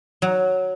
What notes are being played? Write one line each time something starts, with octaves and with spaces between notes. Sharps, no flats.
F#3